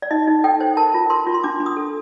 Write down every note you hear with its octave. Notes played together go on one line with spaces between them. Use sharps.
D5
D#4 D#5
D#4
A4 G5
C5
A#4 A5
F4
A#4 C6
F4
C6
D4 D6
D4
D#6
A4